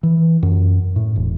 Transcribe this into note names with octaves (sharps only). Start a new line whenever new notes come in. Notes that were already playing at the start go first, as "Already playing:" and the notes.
E3
F#2
A2
E1